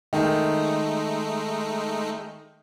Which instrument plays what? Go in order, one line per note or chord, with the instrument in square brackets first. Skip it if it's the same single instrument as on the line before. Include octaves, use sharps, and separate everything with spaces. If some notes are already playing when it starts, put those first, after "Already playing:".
[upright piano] D#3 [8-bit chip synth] G#3 A3 D#4